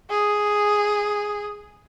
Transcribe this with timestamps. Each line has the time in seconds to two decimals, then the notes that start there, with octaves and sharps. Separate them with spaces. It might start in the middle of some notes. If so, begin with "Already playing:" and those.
0.10 G#4